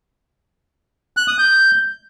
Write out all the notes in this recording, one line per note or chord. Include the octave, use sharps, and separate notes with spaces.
F#6
D#6
G6